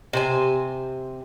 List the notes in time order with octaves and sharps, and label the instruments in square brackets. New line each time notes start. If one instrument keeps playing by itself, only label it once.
[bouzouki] C3 C5 G#5